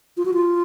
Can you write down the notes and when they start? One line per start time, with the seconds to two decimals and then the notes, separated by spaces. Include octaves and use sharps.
0.17 F4
0.25 F#4
0.34 F4